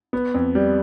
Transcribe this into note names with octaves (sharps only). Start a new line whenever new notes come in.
B3
F2
G3